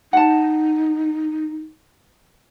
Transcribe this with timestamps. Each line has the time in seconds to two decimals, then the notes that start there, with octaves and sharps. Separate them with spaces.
0.13 D#4 F#5 A5